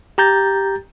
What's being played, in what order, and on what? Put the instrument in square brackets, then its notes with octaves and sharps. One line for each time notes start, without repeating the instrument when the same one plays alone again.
[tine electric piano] G4 A#5 G6 A6